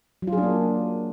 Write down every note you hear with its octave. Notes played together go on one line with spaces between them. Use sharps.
F#3
F4
G#4
D4
A#3